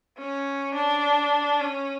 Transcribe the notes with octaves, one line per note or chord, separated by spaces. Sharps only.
C#4
D4
C#4